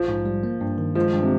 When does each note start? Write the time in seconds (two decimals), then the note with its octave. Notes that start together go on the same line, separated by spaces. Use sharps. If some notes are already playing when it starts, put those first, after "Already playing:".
Already playing: A#1 F3
0.08 G#2
0.26 G3
0.43 A#3
0.61 G2
0.78 D#3
0.95 F3 G#3
1.13 G2
1.23 C3